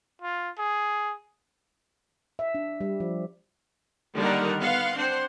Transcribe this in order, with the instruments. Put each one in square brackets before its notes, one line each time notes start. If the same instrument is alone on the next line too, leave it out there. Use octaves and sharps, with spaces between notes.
[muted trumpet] F4
G#4
[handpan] E5
D4
G3
F3
[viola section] D3 D#3 G3 A#3 A#4 F#5
B3 F5 F#5 C6
C4 D4 C5 F#5